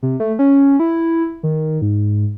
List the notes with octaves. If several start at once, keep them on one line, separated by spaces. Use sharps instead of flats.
C3
A3
C#4
E4
D#3
G#2